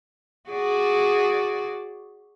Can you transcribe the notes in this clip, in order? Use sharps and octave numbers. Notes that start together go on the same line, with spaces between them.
F#4 G#4 D5